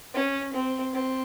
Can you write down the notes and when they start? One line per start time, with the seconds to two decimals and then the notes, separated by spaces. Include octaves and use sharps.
0.14 C#4
0.53 C4
0.93 C4